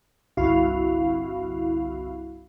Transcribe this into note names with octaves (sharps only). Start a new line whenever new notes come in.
G1 C2 G2 E4 F#4 F5